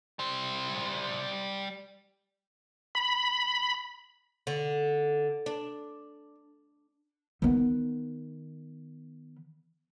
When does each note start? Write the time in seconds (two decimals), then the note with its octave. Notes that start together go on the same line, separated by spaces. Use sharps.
0.19 G3 C5
2.95 B5
4.47 D3
5.46 D4
7.42 D#3 B3